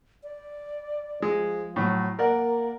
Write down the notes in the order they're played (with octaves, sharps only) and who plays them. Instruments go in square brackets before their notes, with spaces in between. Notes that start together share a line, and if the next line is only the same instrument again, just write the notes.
[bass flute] D5
[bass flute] F3 [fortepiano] G#3
[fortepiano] A2 F#3
[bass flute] A#3 [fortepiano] A#4 D5 F#5